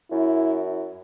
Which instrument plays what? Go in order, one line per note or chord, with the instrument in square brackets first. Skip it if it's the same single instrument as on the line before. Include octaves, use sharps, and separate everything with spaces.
[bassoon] F#2 [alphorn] E4